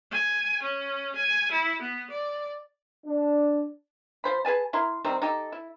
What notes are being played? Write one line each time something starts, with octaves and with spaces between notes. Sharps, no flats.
G#5
C#4
G#5
E4
B3
D5
D4
F3 C5 B5
G#4 B4 G#5 A5
E4 A#4 C6
C3 D#3 G3 C4
D#4 G4 A4
E4